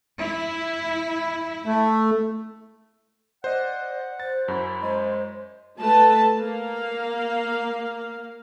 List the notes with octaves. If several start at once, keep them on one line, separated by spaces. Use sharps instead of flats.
E4
A3
C5 D5 D#5 F#5
C5 A6
F#2 E4 F#4
G#3 C5
A3 B4 A5
A#3 F5